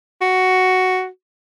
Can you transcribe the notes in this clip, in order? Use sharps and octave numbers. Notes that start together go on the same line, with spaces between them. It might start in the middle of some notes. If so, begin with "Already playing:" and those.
F#4